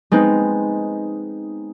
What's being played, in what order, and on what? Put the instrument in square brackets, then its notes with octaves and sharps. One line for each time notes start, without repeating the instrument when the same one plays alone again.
[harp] G#3 B3 C4 D#4